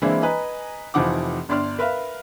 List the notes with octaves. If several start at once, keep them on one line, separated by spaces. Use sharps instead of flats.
E3 G#3 A#3 C4 D4 E4
B4 D#5 G#5 A#5
F1 E3 F3 D#4 F#5 D6
G1 D4 D5 C6 F6
A#4 B4 E5 F5